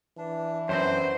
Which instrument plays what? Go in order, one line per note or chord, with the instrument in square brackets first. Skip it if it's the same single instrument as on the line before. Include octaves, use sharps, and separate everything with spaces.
[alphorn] E3 [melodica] D4
[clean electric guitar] F#2 C4 [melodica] B3 D4 F#4 [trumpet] C5